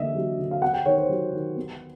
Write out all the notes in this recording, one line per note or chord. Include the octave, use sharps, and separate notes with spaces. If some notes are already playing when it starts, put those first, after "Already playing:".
Already playing: D3 E3 A#3 D#5 E5
F#3
D3
F5
B3 F#5
G5
D#3 C#5
C5
F#3
D#3
B3